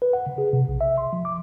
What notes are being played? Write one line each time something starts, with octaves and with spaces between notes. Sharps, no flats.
B4
F#5
C#3
G#4
C3
A#1
E5
C6
F3
D6